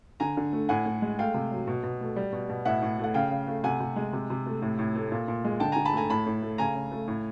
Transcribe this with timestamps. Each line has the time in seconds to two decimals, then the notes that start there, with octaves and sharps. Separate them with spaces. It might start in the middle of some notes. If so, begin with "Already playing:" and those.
0.20 D3 G#5 A#5
0.37 D3
0.53 A3
0.69 A2 F#5 G#5
0.86 A2
1.02 G#3
1.19 A3 F5 G5
1.34 C3
1.52 F#3
1.67 B2
1.83 B2
2.01 A3
2.16 G3
2.32 B2
2.49 B2
2.65 A2 E5 F#5
2.82 A2
2.99 A3 F#5
3.14 C#3 F5 G5
3.31 C#3
3.47 A3
3.64 C3 F#5 G#5
3.80 C3
3.96 G#3
4.13 C3
4.30 C3
4.46 A3
4.62 A2
4.78 A2
4.95 A3
5.12 A#2
5.28 A#2
5.45 G#3
5.60 D3 G5 A5
5.72 D3 G#5 A#5
5.85 A5 B5
5.93 A3 G#5 A#5
6.09 A2 A5 B5
6.26 A2
6.42 A3
6.58 C#3 G#5 A#5
6.75 C#3
6.92 A3
7.08 A2